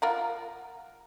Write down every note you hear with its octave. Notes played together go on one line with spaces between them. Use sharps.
F4 A#4 F#5